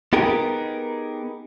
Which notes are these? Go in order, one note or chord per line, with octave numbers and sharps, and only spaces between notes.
B3 D#4 G4 G#4 A#4